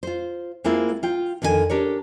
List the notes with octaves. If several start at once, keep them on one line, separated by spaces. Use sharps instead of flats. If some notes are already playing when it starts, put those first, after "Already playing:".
F4 C5
G#3 A#3 C4 E4 F4
F4 G5
F2 D3 D#3 F#4 G#5
D4 G4 A#4 C#5